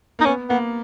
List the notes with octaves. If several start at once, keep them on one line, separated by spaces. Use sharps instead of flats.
A#3 D#4
B3 C#4
A#3 B3